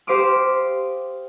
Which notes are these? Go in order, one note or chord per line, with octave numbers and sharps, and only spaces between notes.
G4 C5 F5 D6 D#6